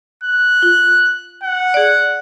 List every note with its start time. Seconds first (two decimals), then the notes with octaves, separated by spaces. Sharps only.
0.24 F#6
0.62 F4
1.43 F#5
1.74 G#4 D5